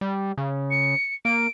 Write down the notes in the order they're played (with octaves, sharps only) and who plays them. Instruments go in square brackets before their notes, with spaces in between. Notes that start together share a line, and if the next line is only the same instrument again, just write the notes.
[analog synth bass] G3
C#3
[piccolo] C#7
[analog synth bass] A#3 [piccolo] D7